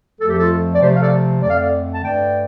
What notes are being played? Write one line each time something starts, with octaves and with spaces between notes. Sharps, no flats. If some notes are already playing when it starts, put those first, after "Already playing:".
F2 F3 A3 A4
G4
F4 A4
D5
C3 F3 A3 G4 C5
F5
A4 D5
F2 D3 A3 D5
F5
A4 D5
A5
G2 D3 A3 D5 G5